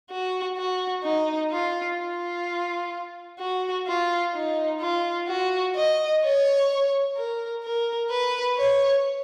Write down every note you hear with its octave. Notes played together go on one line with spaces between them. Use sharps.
F#4
F#4
D#4
F4
F4
F#4
F4
D#4
F4
F#4
D#5
C#5
A#4
A#4
B4
C#5